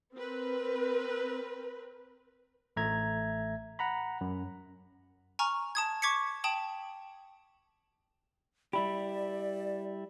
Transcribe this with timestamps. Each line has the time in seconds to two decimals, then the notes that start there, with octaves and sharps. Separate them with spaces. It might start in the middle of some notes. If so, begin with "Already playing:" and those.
0.16 C4 A#4 B4
2.76 A1 A3 E5 A#5 G#6
3.79 F#5 A#5 B5
4.21 F#2
5.39 G#5 A#5 C#6 F6
5.75 A5 D#6 G#6
6.02 C#6 D6 G#6 B6 C#7
6.44 G5 A5 D#6 F#7
8.73 G3 E4 G4 D5 B5